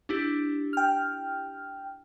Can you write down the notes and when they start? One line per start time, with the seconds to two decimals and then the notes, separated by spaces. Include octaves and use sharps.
0.09 D4 E4 G4
0.73 G5 F6